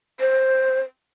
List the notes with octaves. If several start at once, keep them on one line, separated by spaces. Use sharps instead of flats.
C5